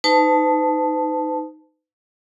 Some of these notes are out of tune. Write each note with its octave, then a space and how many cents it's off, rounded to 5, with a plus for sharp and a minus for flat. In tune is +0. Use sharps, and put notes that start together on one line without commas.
D#4 +0 B4 +45 A5 +0